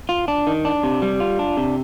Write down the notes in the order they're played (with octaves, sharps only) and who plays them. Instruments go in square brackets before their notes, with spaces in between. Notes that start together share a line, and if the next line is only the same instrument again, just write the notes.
[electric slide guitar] F4
D4
D#3
D4
C3
G3
F4
D4
C3